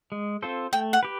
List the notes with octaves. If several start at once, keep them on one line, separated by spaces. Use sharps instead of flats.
G#3
C4 F4 A4 C5
A3 G5
F#5
G4 B4